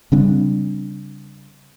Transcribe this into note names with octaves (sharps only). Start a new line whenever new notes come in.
C#3 G3 C4 D4